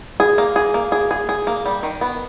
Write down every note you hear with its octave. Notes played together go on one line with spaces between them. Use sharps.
G#4
A#3
G#4
A#3
G#4
G#4
G#4
A#3
G3
D#3
B3